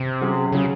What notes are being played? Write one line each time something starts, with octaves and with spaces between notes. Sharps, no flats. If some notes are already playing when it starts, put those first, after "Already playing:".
Already playing: C3
F#3 C#4 G#4
C#3 F#3 C#4 G#4